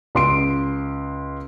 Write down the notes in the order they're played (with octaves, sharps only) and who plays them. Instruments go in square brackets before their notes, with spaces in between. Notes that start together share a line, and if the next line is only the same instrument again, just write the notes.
[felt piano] C#2 C6 D7